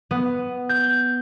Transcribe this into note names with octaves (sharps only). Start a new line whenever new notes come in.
B3
G6